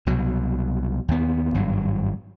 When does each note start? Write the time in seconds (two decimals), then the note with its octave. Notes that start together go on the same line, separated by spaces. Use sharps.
0.06 C2 B2 F#3
1.08 D#2 B3
1.54 G#1 G2 F#3